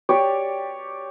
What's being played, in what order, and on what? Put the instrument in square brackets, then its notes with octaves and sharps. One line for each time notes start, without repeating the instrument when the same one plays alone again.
[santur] G4 C#5 D5